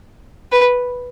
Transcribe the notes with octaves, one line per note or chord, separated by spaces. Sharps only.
B4